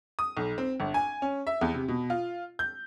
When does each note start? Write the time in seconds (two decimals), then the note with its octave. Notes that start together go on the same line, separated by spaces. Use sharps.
0.19 D#6
0.37 B1
0.58 C4
0.80 G1
0.94 G#5
1.22 C#4
1.47 E5
1.61 E2
1.74 C3
1.88 B2
2.10 F4
2.59 G6